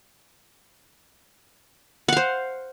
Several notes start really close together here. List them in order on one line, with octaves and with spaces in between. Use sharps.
F#5 F5 C5